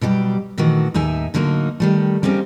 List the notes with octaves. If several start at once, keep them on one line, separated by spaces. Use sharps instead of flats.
B2 F#3 G3 G4
A#2 D#3 E3 A3 F#4
D#2 A2 D#4 E5 G#5
A2 D3 F#3 A#3 C#4 D#4
D#3 G3 A3
G3 A#3 C4 C#4 D#4